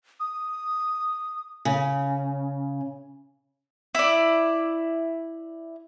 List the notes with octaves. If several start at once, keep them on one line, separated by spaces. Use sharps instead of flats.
D#6
C#3
E4 D5